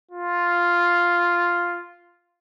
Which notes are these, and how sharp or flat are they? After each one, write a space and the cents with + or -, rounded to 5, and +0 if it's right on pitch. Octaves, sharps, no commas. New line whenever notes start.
F4 +0